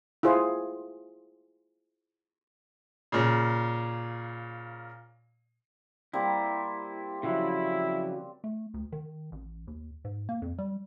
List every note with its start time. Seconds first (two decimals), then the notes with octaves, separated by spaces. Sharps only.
0.23 E4 F4 G#4 C5
3.12 A#2 C#3
6.13 G3 A#3 C4 E4
7.23 C#3 F3 F#3 E4
8.44 A3
8.74 D2
8.92 D#3
9.32 A1
9.67 D#2
10.05 G#2
10.29 A#3
10.42 F2
10.58 G3